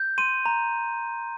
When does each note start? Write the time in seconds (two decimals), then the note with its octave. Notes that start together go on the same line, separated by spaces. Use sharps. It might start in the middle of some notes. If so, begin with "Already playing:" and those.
Already playing: G6
0.18 C6 D#7
0.46 A#5